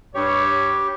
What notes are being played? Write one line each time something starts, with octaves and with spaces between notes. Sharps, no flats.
G2 G4 C#5